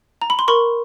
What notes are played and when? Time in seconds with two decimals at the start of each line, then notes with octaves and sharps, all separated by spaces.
0.22 A#5
0.30 B5
0.39 C6
0.48 A#4 B5 C#6